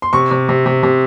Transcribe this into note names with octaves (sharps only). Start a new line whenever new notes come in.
C6
C3 C#6
C3
C3
C3
C3